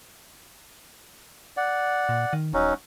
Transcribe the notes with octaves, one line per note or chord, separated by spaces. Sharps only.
D5 F#5
A#2
D#3
D#1 F#3 C#4 D#4